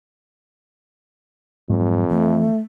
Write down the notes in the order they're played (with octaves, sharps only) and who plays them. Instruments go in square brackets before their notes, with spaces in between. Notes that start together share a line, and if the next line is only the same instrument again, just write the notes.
[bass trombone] F2 [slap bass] G#2 F#3
[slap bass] E3 F3 [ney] A3